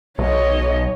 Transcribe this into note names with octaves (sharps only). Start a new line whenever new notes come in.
B1 C#5 D#5